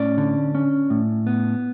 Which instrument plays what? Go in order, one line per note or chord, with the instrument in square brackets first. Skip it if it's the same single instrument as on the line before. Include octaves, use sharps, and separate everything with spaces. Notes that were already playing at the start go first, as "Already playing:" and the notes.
Already playing: [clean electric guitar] A2 C#4 D5
D3
C#4
A2
B3